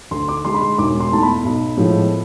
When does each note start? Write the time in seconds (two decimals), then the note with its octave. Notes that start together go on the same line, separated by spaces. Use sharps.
0.11 D2 C6
0.28 D6
0.44 D3 G#3 C6
0.54 B5
0.61 C6
0.78 E1 D6
1.00 C6
1.11 E2 B2 A3 A5
1.23 B5
1.45 B1
1.77 A2 F3 G#3 B3